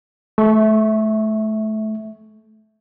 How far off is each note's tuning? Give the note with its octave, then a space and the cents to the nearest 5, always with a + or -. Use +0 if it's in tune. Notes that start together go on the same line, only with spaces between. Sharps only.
A3 -25 E5 -10 C#6 +0